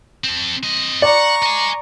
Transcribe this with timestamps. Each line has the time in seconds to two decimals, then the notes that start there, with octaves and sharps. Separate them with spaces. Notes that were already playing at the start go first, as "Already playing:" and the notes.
0.24 C4 A4
0.64 C4 D#5
1.02 D5 F#5 A#5 C#6
1.43 D#5 G#5